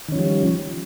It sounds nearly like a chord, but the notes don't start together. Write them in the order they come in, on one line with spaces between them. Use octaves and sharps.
D#3 C#4 F3 G3